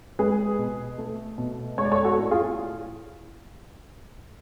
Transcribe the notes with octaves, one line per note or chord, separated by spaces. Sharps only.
G#3 G#4 B4
B2
A3
B2
G#3 C#5
D5
A4 C#5
F#4 A4
A2
F4 G#4